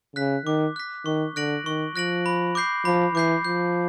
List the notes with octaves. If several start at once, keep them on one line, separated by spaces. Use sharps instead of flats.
C#3 F#6 B6
D#3 D6
F#6 B6
D#3 C#6
D3 F#6 A#6 D7 F#7
D#3 C#6
F3 F#6 A#6 D7 F#7
B5
D6 G6 C7
F3 B5
E3 D6 G6 C7
F3 G6